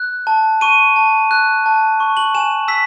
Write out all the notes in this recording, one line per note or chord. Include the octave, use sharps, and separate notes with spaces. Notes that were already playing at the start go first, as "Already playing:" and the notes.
Already playing: F#6
A5
C#6 D#7
A5
F#6
A5
C#6
F#7
G#5 E7
E6 B6